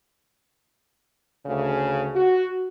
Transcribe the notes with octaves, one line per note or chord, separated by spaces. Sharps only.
D2 C#3
F#4